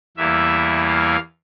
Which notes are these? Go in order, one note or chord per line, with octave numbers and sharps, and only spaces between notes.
E2 E3 G3 A#3 E4 E5
F5